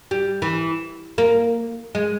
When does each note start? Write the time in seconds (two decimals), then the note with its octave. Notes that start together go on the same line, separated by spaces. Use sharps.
0.11 G3
0.42 E3
1.18 A#3
1.95 G#3